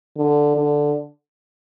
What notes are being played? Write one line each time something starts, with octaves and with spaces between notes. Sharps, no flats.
D3
D3